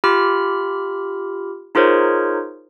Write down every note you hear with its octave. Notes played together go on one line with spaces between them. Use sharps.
F4 G4 B5 F6
D#4 F4 G#4 A#4 C5 C#5